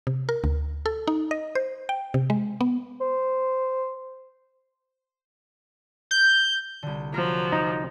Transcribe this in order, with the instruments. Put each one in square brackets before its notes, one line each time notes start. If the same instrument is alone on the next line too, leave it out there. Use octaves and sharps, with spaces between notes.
[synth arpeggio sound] C3
A#4
D2
A4
D#4
D#5
C5
G5
C3
G#3
B3
[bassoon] C5
[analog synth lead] G6
[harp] C2 D3
[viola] F3 F#3 [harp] A#4 F6
[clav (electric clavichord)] D#4